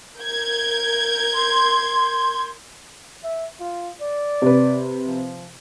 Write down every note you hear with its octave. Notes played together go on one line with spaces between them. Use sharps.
A#4 G6 G#6
C6
E5
F4
D5
C3 B4
F3